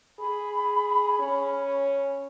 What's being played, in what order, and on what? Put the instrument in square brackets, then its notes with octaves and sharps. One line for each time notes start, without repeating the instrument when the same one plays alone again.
[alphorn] G#4 [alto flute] B5
[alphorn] C#4